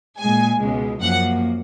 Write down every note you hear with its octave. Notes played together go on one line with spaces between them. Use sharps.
A#2 G#3 G#5
C#2 B2 G#3
F#2 F3 A#3 F#5